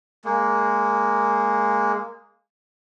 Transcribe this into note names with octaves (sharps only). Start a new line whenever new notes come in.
G#3 A#3